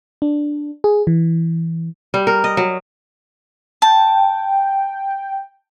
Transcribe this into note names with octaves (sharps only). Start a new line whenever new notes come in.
D4
G#4
E3
G3
A#4
D#5
F#3
G5 A5